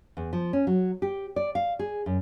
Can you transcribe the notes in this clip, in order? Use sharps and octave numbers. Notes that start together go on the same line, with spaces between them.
E2
F3
C#4
F#3
G4
D5
F5
G#4
F#2